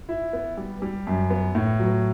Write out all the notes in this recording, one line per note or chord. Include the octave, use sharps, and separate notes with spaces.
E4
B3
G3
G3
F#2
B3
A2
F#3